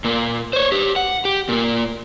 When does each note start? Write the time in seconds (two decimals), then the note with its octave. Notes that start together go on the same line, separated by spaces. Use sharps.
0.04 A#2 A#3
0.53 C5 C#5
0.72 G4 B4
0.96 F#5
1.25 G4
1.49 A#2 A#3